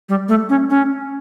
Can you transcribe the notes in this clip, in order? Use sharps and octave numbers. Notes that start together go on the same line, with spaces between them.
G3
A3
C#4
C#4